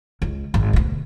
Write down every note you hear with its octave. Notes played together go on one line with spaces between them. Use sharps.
C#2
G#1
D2 B2